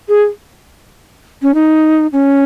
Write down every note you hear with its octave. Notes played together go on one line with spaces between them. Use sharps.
G#4
C#4
D#4
C#4